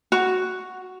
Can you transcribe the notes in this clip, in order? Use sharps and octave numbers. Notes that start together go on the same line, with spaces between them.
F#4